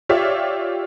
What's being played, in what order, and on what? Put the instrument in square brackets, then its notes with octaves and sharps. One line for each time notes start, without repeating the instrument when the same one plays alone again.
[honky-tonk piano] F4 G4 C#5 D5 E5